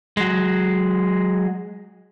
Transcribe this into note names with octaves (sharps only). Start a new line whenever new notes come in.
F#3 G#3